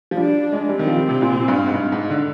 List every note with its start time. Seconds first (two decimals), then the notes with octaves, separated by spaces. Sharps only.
0.11 F3
0.17 G3 D4
0.52 G#3
0.69 G3 C4
0.79 D#3
0.87 F3
0.96 G3
1.09 C3
1.22 A#2
1.48 G2
1.67 G#2
1.74 G2
1.92 G#2
2.10 D3